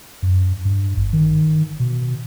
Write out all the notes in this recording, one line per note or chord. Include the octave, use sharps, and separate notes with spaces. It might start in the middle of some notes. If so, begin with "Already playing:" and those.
F#2
G2
G#1
D#3
B2